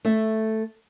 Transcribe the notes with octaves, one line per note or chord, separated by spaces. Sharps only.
A3 A4 E5